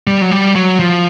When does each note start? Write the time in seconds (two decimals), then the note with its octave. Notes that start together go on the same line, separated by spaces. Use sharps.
0.07 G3
0.21 F#3
0.31 G3
0.55 F#3
0.80 F3